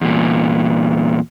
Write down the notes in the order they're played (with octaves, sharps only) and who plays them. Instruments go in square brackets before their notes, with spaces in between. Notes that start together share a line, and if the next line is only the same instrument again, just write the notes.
[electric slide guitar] E2 A#2